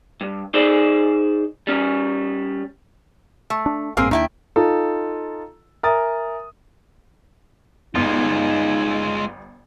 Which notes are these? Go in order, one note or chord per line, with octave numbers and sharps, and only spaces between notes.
G2
D#4 G#4 C5 D5
G3 C#4
A3
D4
A1 G2 A#3 C4 G#4
D#2 D#3 A#3 D4 E4 G5
D#4 F4 A4
A#4 E5 G#5 D#6 A6
G1 G#3 D#4 F4